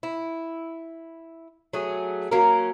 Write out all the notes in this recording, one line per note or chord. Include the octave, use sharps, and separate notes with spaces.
E4
F#3 A3 G#4
F#3 A#3 C#4 A#4